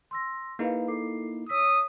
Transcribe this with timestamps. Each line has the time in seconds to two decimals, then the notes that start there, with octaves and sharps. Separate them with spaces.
0.11 C6 E6 A#6
0.59 A#3 D#4 E4 G#4 B4 F5
0.88 A4 D6 C7
1.49 C#5 D#6 E6 B6